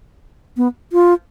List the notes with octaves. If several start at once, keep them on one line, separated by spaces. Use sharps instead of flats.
B3
F4